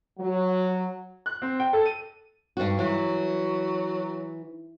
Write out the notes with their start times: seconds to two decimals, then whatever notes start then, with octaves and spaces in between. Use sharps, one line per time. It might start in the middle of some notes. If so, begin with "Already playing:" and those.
0.19 F#3
1.26 F#6
1.42 C4
1.60 G5
1.73 A4
1.86 D#7
2.57 G2 F#4
2.79 E3 F#3